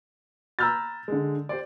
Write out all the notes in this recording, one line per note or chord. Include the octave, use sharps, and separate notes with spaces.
A#5 B5 E6 F6 G6 A6
D3 G#3
G4 C5 D5